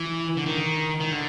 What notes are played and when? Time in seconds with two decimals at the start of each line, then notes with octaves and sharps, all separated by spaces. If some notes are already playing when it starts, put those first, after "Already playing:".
Already playing: E3
0.37 D3
0.46 D#3
1.00 D#3
1.12 D3